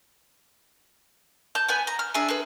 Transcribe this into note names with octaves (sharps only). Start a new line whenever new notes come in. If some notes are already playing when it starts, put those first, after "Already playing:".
A5 G6
B3 B4 G#5
A#5
F6
D4 G#4 E5 G#5
G#4 A4 B4